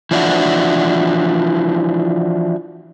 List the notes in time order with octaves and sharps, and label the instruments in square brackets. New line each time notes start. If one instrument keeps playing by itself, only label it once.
[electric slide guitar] E3 F3 D4 E4 F#4